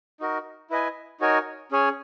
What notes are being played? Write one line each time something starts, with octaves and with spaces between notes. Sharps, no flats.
D#4 F#4 A#4
E4 B4 D#5 G#5
D#4 F#4 A#4 C#5 G#5
C#4 G#4 C#5 G#5